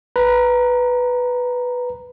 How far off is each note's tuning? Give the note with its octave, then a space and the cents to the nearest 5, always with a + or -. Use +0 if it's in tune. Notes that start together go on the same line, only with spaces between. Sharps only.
B4 +0 A#5 +0